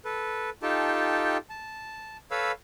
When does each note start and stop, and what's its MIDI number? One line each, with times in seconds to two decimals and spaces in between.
0.05 0.50 69
0.05 0.50 71
0.63 1.37 63
0.63 1.37 65
0.63 1.37 67
0.63 1.37 69
0.63 1.37 79
0.63 1.37 81
1.50 2.17 81
2.31 2.52 69
2.31 2.52 71
2.31 2.52 73
2.31 2.52 77
2.31 2.52 83
2.31 2.52 88